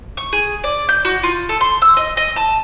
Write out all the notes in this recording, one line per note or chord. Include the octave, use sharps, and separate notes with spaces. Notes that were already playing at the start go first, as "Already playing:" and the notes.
C#6
G#4
D5
G6
F#4
F4
A4
C6
E6
D#5
D#5
A5